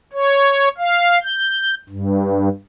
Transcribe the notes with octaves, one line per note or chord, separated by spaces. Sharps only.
C#5
F5
G6
G2